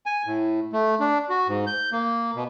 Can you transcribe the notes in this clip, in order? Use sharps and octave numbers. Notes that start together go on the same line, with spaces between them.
G#5
A2
A3
D4
F#4
G#2
G6
A#3
B2